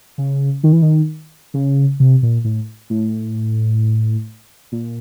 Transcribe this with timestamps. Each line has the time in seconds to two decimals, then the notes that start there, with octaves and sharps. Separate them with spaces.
0.18 C#3
0.63 D#3
0.72 E3
0.82 D#3
1.54 C#3
2.00 C3
2.23 A#2
2.44 A2
2.90 A2
4.72 A#2